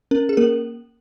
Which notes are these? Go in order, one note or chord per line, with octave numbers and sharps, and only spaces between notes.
C#4 A#4
G#4
A#3 A#4